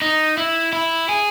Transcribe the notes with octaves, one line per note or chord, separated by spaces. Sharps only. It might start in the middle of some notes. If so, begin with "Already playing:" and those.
D#4
E4
E4
G#4